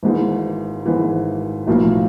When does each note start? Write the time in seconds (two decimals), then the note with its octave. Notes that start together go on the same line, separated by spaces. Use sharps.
0.03 G#1 G#2 E3
0.86 G#1 G#2 E3
1.67 B1 A2 F3 A#3